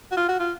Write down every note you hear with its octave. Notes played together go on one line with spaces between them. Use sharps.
F#4
F4
F#4
F4